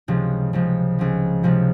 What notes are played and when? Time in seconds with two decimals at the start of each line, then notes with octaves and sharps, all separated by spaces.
0.08 C#2 C3 F3
0.53 C#2 C3 F3
0.99 C#2 C3 F3
1.43 C#2 C3 F3